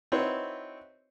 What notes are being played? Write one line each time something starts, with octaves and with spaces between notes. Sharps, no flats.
C4 D#4 E4 F#4 B4 C#5